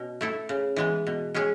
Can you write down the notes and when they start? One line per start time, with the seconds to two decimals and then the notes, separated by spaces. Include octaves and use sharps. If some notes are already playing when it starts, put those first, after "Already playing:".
Already playing: B2 C#4
0.21 A3 E4 A4
0.49 C#3
0.76 E3 G#3 B3
1.07 B2
1.34 G#3 C#4 G#4